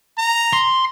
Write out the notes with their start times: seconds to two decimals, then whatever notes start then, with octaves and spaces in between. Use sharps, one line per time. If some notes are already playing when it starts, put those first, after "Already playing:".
0.18 A#5
0.53 C6